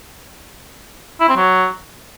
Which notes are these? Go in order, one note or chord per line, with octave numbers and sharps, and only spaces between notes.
E4
C4
F#3